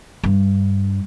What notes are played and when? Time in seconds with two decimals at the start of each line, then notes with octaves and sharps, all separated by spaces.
0.24 G2